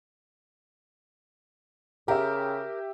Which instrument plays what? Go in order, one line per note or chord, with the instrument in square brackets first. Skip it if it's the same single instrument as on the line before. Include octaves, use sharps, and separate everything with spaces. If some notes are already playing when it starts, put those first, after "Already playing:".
[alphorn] C#3 [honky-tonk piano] G4 E5 [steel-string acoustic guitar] A#4